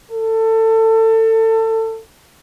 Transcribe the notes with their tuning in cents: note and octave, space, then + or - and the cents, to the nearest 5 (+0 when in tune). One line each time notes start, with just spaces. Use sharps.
A4 +25